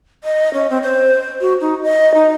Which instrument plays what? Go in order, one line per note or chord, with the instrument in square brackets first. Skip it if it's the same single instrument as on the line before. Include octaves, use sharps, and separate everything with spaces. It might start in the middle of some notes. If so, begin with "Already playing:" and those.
[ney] D#5
C#4
C4
C5
F#4
D#4
D#5
D#4